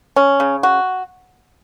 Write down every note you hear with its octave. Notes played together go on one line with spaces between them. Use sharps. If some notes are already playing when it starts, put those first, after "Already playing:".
C#4
C#3
F#4